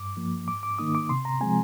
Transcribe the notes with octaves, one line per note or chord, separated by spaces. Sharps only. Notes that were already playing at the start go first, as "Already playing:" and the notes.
Already playing: G2 D6
F3 A#3
G#2 D6
D6
D#3 A#3 D#4 D#6
D6
C3 C6
A#5
F3 G#3 C4 G#5